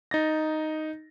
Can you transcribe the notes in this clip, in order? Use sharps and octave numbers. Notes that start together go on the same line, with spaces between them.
D#4 A6 A#6